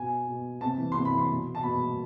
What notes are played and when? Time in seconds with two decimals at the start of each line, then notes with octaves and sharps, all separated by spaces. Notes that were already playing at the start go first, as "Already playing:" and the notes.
Already playing: B2 G#5
0.27 B2
0.61 C3 A5
0.78 E3
0.92 C3 C6
1.05 B5
1.12 E3
1.18 C6
1.29 B2
1.55 A5
1.63 B2 B5